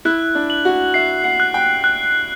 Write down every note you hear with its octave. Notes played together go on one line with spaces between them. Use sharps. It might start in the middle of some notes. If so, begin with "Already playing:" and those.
E4 F#6
D4
F#7
F#4
E5 C7
F#5
F#6
G5
F#6